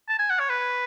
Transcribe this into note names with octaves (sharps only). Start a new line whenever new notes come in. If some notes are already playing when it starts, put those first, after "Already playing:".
A5
G#5
F#5
C#5
B4